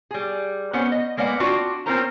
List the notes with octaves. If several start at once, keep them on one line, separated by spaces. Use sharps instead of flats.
G3 G#4
B3 C#4 C5 F#5
D#5
G#3 A#3 B3 D5 F#5
C4 D4 F4 F#4
C4 C#4 F4 A#4 C5 A#5